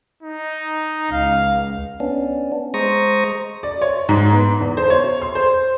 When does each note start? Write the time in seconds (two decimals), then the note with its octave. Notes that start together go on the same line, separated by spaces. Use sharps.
0.23 D#4
1.12 C#2 F5
2.00 B3 C#4 D4
2.74 G#3 C5 A#5 C#6 D#6 A#6
3.63 D5
3.82 C#5
4.09 G#2
4.33 B3
4.61 E2
4.77 C5
4.90 C#5
5.22 C6
5.35 C5